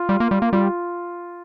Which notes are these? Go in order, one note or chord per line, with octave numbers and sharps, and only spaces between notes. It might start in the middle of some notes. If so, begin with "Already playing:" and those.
Already playing: F4
G3
A#3
G3
A#3
G3 F4